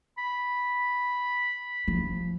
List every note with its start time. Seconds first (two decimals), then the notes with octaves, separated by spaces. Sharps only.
0.18 B5
1.88 F3